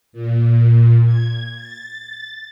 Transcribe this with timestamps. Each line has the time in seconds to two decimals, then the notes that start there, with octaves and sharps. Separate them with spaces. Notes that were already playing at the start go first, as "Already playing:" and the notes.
0.13 A#2
1.06 G#6
1.56 A6